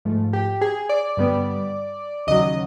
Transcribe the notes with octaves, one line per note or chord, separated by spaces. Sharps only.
G#2 F3 A3
G4
G#4
D5
G2 D3 G3 B3
D#2 C#3 F#3 D#5